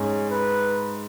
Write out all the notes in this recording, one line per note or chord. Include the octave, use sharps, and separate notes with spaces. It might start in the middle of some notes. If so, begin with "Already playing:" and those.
Already playing: G#2 C#4
B4